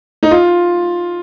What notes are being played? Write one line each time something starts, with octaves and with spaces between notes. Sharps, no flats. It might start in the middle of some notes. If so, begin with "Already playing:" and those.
D#4
F4